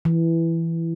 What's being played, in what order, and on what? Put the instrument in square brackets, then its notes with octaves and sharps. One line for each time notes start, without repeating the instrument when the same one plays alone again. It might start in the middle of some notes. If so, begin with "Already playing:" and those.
[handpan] E3